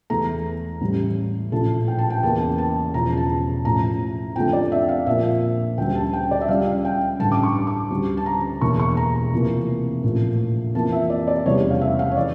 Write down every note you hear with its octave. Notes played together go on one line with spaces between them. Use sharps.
E2 E3 A3 A#5
A1 A2 E3 G3
A#1 A2 F3 A3 A5
G5
A5
G5
E2 C#3 E3 A#3 A5
A5
E1 E2 C#3 F3 A#5
A5
A1 A2 F3 A#5
F2 D3 F3 A3 G5
D5
E5
F5
A#1 A#2 F3 A#3 E5
D2 C#3 G3 G5
A5
G5
D5
E5
C#2 C#3 G3 F5
G5
A1 G2 D3 A5
D6
C#6
D6
D2 C#3 G3
A5
A#5
E1 E2 E3 A#3 C#6
C#6
A#5
F1 F2 E3 A#3
A#1 A2 F3 A#3
F2 E3 A#3 A5
E5
D5
D5
F1 E2 C#3 G3 C#5
F5
E5
F5
C#5
E3 D5